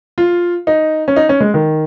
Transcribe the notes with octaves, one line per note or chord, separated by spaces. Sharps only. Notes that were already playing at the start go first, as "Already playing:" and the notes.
F4
D#4
C#4
D#4
C#4
G#3
D#3